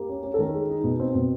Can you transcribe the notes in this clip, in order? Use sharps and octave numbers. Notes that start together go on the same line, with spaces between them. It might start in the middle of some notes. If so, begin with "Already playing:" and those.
Already playing: A#3 G4
C#4
C#4
A4
D#3 A#4
G#3
D#4
B2
C4 C5
B2